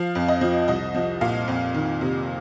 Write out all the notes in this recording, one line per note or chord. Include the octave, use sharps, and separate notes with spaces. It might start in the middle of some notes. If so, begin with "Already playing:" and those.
Already playing: F3 F5
F2
D#5
F3
C2 D#5
F3
A#2 F5
F2
D#3
C3